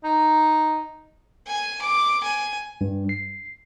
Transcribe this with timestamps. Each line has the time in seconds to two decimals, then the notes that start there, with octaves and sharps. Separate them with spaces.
0.04 D#4
1.47 G#5
1.81 D6
2.23 G#5
2.81 G2
3.09 C7